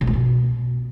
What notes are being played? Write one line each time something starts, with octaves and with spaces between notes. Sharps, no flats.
C#3
A#2
B2